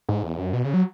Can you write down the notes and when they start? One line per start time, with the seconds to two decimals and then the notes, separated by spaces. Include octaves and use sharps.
0.09 G#2
0.23 E2
0.38 F#2
0.53 B2
0.64 C#3
0.74 F#3